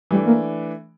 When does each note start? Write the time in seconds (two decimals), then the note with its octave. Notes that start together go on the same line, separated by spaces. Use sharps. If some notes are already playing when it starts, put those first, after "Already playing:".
0.11 E3 G3 A3 D4
0.26 A#3